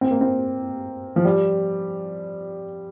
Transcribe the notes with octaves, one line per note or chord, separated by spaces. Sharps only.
C4
A#3
C4
F3
G3